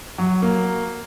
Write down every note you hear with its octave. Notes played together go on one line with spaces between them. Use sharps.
F#3
A#3